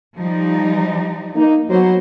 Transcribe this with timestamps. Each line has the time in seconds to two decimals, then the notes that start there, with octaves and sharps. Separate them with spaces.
0.17 F3 G3 D#4
1.35 A#3 D#4
1.69 F#3 A#3 B3 C5